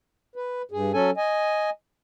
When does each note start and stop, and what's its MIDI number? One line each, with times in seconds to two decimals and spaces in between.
0.36 0.62 71
0.71 0.92 43
0.71 0.92 68
0.94 1.11 54
0.94 1.11 61
0.94 1.11 69
0.94 1.11 80
1.17 1.70 75
1.17 1.70 80